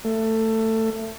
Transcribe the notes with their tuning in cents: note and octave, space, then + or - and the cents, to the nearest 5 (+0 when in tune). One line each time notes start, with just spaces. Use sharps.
A3 +15